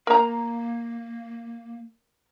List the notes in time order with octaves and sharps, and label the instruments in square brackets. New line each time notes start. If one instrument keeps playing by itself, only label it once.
[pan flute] A#3 [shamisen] A#4 A#5